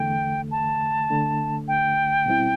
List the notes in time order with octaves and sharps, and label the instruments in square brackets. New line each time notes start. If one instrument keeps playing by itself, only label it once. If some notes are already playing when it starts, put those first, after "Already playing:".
Already playing: [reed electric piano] E2 D3 A3 [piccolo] G5
[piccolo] A5
[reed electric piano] D2 D3 A3 D4
[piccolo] G5
[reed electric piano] B2 G3 C4 E4